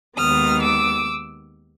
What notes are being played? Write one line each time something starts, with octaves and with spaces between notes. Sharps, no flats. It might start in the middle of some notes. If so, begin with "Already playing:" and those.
D#2 D#3 G#3 B3 D#6 F6
D6 E6